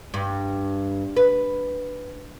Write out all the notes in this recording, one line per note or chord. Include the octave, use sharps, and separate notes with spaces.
G2
B4